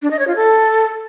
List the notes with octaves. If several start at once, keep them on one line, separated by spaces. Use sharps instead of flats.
D4
D#5
C#5
F4
A4